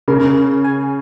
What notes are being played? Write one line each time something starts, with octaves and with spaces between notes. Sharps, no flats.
C#3 A#4
G#5